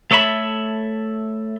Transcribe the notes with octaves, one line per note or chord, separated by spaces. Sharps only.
A3 A4 C#5 E5 B5